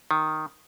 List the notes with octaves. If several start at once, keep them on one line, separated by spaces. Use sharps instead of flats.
D#3